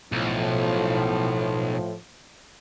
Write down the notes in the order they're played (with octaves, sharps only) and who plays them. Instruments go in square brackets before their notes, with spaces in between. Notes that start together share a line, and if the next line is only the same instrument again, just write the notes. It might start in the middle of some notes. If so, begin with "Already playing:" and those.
[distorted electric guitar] B1 [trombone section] A2 F3